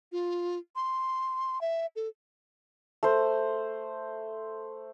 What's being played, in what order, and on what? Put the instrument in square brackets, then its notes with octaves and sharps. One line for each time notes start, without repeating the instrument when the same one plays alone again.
[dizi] F4
C6
E5
A4
[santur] A3 C5